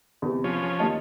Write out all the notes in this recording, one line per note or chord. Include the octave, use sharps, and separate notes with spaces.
E2 C3
F3 C#4
D#2 D#5 A5